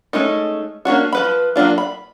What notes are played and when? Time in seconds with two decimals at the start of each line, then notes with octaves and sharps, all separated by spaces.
0.13 G#3 A3 C#4 D#4
0.85 A#3 C#4 D4 F#4
1.12 F3 B4 B5
1.56 F#3 A#3 D4 F4
1.78 B5